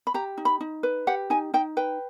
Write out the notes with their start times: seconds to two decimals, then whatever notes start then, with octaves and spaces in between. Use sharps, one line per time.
0.07 B5
0.14 G4 A#5
0.37 D#4
0.45 B5
0.61 D#4
0.83 B4
1.07 G4 F#5
1.30 D#4 G#5
1.54 D#4 G5
1.77 B4 G5